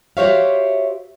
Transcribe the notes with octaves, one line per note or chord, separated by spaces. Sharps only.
F#4 G4 C5 C#5 E5 F5